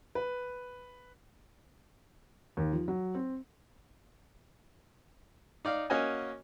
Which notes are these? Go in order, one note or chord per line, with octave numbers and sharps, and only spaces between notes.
B4
D#2
F3
F#3
C4
D#4 D5 F5
A#3 C#4 F#4 D#5 G#5